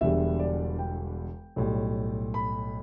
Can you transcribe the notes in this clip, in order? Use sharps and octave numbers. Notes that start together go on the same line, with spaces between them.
E1 E2 D3 G3 E5
D5
G5
B1 A2 G3
B5